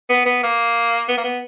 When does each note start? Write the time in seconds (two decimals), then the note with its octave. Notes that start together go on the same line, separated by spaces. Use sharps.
0.10 B3
0.26 B3
0.43 A#3
1.09 B3
1.18 A#3
1.24 B3